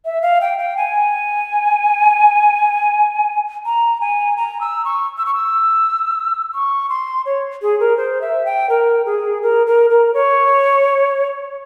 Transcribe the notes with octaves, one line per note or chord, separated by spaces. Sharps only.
E5
F5
G5
G5
G#5
A#5
G#5
A#5
E6
C#6
E6
C#6
E6
C#6
C6
C#5
G#4
A#4
C5
E5
G5
A#4
G#4
A#4
A#4
A#4
C#5